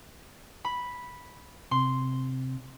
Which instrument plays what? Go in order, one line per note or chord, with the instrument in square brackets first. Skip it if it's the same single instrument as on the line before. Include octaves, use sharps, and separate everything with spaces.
[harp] B5
[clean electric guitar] C3 [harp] C6